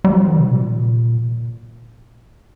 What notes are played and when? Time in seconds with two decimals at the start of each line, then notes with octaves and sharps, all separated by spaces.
0.04 G3
0.15 F3
0.27 D#3
0.39 C3
0.50 A#2